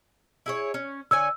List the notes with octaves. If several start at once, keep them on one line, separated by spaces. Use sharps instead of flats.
E4 G#4 C#5
C#4
D3 C#5 G#5 E6